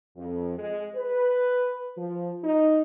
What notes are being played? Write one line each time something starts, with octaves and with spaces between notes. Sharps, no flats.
F2
G#3
B4
F3
D#4